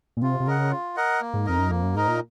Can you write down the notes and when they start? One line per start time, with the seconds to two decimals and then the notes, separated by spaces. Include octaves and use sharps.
0.17 A#2
0.22 C3 F4
0.40 C3
0.47 C#3 A#4 D#5 F#5
0.71 F4
0.96 A#4 D#5 F#5
1.21 A#3
1.34 G#2
1.46 F2 D#4 A#4 D#5
1.58 F#2
1.70 F2 A#3
1.83 F#2
1.95 G#2 D#4 A#4 D#5
2.08 A#2